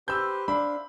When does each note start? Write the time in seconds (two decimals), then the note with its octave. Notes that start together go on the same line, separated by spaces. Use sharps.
0.08 G4 B4 C5 E6 G6
0.48 D4 C5 E5 F5 B5